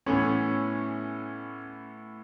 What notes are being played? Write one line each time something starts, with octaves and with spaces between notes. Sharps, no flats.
A2 E3 B3 C#4